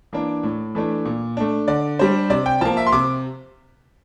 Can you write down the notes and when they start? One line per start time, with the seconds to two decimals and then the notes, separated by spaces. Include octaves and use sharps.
0.13 E3 A#3 D4
0.43 A2
0.75 E3 A3 D4
1.05 A#2
1.37 A3 D4
1.68 D3 D5
1.99 G3 D4 C5
2.30 C3 D5
2.46 G5
2.61 F3 A#3 A5
2.77 E5
2.86 C6
2.92 C3 D6